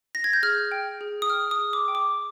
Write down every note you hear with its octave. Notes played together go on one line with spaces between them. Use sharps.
A#6
G#6
G6
G#4 F6
G5
G#4
D#6
G5 F6
D#6
G#4
D6
G5
D6